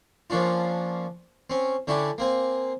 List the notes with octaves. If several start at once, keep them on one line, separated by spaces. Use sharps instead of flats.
F3 A#3 C#4 D4 F4
C4 C#4
D3 C#4 D4 E4 G4
A#3 C4 G#5